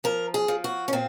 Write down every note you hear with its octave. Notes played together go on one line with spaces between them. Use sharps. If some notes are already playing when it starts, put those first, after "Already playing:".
F3 A#4
G#4
F3
F#4
C#4
A#2 C4